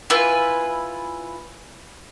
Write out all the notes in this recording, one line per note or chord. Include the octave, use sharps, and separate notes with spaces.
E4 F4 B4 G#5